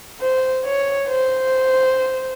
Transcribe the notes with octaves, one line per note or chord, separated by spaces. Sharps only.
C5
C#5
C5